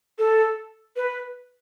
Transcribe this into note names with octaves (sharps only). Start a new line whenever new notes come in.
A4
B4